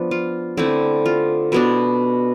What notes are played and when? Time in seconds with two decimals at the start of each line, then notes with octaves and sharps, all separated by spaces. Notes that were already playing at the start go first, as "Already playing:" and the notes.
Already playing: F3 B3 D4
0.11 F4
0.57 D3 A3 C4 E4
1.06 F4
1.52 B2 B3 D4 E4